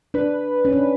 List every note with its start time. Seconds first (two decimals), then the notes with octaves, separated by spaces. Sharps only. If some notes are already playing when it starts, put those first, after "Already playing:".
0.14 D4 B4
0.65 C#4
0.73 D4